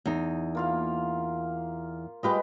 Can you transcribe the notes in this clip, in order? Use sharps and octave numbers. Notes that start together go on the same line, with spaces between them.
E2 D#4
A#3 F4 F5
G3 G#3 F4 G4 B4 D#5